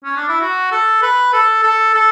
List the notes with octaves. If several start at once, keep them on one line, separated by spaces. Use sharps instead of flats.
C#4
D4
E4
F#4
A4
B4
A4
A4
A4